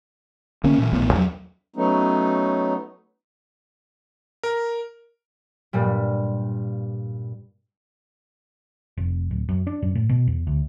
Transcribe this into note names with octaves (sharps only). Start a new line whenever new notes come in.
D3 A#3 C#4
A#2 E3
D#1 A#1 A2 B3
E2 D#3 F#3
F#3 A3 B3 C#4 D#4
A#4
G2 A#2 G3
F1
D1
F#2
D4
F#2
A2
B2
E2
D2